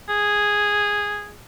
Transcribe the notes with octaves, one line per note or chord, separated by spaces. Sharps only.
G#4